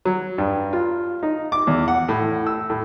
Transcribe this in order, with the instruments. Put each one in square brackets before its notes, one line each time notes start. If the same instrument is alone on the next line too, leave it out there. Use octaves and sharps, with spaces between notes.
[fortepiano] F#3
G2
F4
D#4
D6
E2
F#5
A2
E6
A2